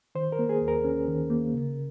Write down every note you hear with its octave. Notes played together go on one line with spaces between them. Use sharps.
D#3 C5
A#4
A#3
G#4
D#2
A#4
C#4
D#3
A#3
C#3